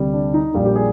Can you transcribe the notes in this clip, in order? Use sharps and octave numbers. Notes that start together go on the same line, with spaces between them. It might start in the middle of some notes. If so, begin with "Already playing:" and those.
Already playing: D2 C3 G3
D4
D#4
A#1 A#2 G3 F4
G4
G#4